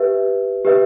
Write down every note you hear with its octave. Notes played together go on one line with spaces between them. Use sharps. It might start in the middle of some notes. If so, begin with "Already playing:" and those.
Already playing: G4 B4 E5
G4 B4 E5